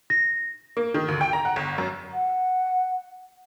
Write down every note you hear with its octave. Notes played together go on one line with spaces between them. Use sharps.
A#6
A#3
D#3
D2
G5
A#5
F#5
G1
F#2
F#5